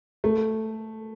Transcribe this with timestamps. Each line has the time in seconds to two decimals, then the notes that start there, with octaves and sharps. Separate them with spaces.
0.24 A3